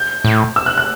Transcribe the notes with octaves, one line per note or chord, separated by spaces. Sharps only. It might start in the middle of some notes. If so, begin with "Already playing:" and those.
Already playing: G6
A2
E6
F#6
F#6